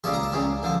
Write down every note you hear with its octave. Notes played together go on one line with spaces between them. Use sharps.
C#2 C#3 G3 A5
A#5
A5
C#2 C#3 G3
D3 F3